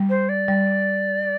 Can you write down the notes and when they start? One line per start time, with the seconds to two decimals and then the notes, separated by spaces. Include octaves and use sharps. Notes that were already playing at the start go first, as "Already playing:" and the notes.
Already playing: G3
0.10 C5
0.29 D5
0.48 G3